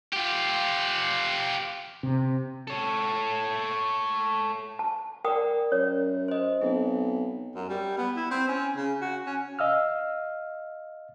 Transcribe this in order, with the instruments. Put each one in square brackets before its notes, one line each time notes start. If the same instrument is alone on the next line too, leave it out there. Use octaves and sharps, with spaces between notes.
[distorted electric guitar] F4 G4
[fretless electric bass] C3
[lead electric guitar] A4 C#5
[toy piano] A5
[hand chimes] A#4 D5 [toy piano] G5 D#6
[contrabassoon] F#2 [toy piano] C#5
[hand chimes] C5 D#5
[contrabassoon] B1 [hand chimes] C4
[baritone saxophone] F#2
G3
B3
E4
C4
C#4
C#3
F#4
C#4
[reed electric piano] D#5 F5 E6 F6